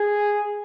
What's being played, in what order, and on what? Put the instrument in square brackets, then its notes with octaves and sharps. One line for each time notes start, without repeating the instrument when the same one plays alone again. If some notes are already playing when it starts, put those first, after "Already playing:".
Already playing: [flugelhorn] G#4